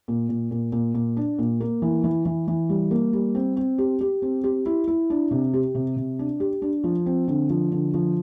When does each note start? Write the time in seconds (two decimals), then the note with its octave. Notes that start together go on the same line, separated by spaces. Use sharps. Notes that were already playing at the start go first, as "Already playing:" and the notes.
0.08 A#2
0.29 A#2
0.51 A#2
0.72 A#2
0.95 A#2
1.17 D4
1.39 A#2
1.60 A#3
1.82 E3
2.04 E3
2.25 E3
2.47 E3
2.69 G3
2.91 A#3
3.13 G3
3.35 C4
3.57 C4
3.78 G4
4.01 G4
4.22 C4
4.44 G4
4.66 E4
4.87 E4
5.10 D4
5.31 C3
5.54 G4
5.75 C3
5.96 C3
6.19 D4
6.40 G4
6.62 D4
6.84 F3
7.06 C4
7.28 D3
7.50 F3
7.72 D3
7.94 F3